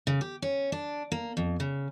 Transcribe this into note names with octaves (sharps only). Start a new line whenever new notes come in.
C#3
G4
C#4
D4
A#3
F2
C#3